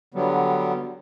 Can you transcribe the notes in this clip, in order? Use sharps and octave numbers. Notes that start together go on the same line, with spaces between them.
D3 F#3 G3 B3